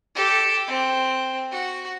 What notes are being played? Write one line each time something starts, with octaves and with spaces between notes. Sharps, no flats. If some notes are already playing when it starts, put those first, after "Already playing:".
G4 A4
C4
F#4